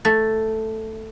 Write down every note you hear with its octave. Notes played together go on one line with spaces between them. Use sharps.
A3